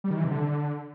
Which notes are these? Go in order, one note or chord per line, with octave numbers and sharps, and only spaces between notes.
G3
D#3
E3
C3
D3